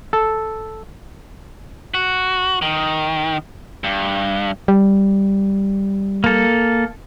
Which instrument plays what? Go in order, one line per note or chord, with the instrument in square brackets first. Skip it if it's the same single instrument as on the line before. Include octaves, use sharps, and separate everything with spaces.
[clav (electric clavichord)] A4
[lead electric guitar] F#4
D#3
G2
[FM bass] G3
[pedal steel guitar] A#3 A4